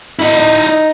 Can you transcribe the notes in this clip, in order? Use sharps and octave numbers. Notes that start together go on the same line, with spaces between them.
E4 D#5
D#4